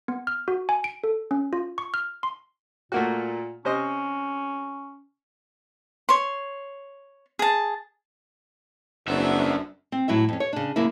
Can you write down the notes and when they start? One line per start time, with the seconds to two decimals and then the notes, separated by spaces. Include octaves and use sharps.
0.08 B3
0.27 F6
0.48 F#4
0.69 G#5
0.84 D7
1.04 A4
1.31 C#4
1.53 F4
1.78 C#6
1.94 F6
2.23 C6
2.92 A#2 A3 A#3 F#4
3.65 C3 C#4 C5 D#5
6.09 C#5 C6
7.39 G#4 A5
9.08 F#1 F#2 F#3 B3 C4 D4 E5
9.92 C4
10.08 A2 F#3 E4 F#4 E5
10.29 F2 C#4
10.40 C#5
10.53 C#3 D4
10.76 F#2 C#3 A#3 E4